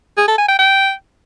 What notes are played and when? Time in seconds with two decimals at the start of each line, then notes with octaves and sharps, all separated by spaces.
0.18 G#4
0.28 A4
0.38 G#5
0.49 G5
0.59 G5